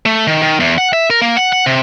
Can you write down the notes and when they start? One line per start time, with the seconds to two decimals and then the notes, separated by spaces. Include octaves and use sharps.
0.06 A3
0.27 D#3
0.42 D#3
0.60 E2
0.78 F#5
0.93 E5
1.10 A#4
1.22 A#3
1.37 F#5
1.53 F#5
1.66 C3